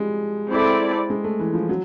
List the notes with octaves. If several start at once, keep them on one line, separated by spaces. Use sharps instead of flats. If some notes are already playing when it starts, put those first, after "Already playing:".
Already playing: F3 G3 G#3
C4 E4 A4 D5
G#3
A3
E3
F3
F#3